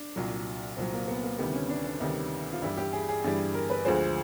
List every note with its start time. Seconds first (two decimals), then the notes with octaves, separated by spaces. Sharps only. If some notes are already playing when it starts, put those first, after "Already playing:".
Already playing: D4
0.16 C2 A#2 F#3
0.77 C2 A#2 F#3 C4
0.93 A#3
1.08 B3
1.23 A#3
1.39 D2 C3 D#3 G3 B3
1.54 C#4
1.69 D4
1.85 D4
2.00 D2 C3 D#3 G3 D#4
2.53 F4
2.62 G2 E3 G3 E4
2.77 G4
2.93 G#4
3.09 G#4
3.24 G2 E3 G3
3.54 A#4
3.70 B4
3.85 D2 D3 F3 G#3 C5